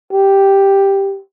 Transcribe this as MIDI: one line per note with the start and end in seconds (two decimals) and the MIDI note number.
0.12 1.18 67